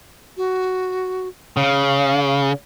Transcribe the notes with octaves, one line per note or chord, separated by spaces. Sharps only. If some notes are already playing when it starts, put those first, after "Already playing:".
F#4
C#3 F5